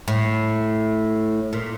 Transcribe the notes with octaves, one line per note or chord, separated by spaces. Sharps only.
A2
A#2